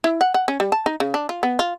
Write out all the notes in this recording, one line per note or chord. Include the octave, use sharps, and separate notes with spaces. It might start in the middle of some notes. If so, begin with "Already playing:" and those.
E4
F#5
F#5
C#4
G3
A5
D#4
C#3
D4
F4
B3
F4